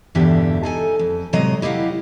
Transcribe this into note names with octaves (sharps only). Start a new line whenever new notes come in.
E2 G2 B2 D3 G4 E5
D#4 A4 G#5
F2
A2 C3 F#3 G#3 D#5 A#5
E4 G4 D#5 F5 F#5